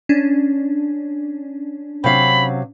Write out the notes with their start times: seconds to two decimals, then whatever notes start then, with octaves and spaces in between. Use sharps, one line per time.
0.09 C#4 D4
2.04 C3 F#3 F5 B5